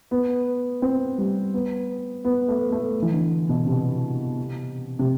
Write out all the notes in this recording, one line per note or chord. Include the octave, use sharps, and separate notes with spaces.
B3
C4
G3
B3
B3
A3
A3
E3
D3
B2
C3
C3